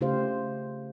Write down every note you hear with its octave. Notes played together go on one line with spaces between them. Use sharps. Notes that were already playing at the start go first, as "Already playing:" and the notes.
C#3 A3 F4 G4 C5 F5